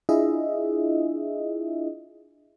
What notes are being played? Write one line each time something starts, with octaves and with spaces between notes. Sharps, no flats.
D4 E4 F4 G#4 D#5 E5